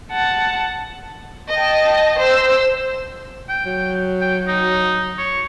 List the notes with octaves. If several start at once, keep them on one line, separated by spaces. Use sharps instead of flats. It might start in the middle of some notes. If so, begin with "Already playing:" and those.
F#5 A5
D#5 G5 A5
C5 E6
G5
F#3
G5
D#4
C#5